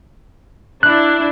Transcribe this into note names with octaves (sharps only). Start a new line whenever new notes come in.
D4 E4 F#6